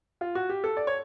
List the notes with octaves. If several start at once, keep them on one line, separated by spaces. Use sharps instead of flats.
F4
F#4
G4
A4
D5
C#5